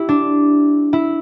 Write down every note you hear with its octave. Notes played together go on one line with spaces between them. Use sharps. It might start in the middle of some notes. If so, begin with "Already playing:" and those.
Already playing: E4 G4
D4
E4